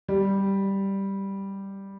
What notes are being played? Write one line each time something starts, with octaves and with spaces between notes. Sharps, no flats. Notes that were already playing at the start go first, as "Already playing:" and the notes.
G3